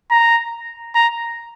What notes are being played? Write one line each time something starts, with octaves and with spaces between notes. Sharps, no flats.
A#5
A#5